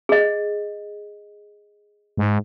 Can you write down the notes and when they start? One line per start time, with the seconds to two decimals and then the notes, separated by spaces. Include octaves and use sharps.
0.09 G#4 D#5
2.17 G#2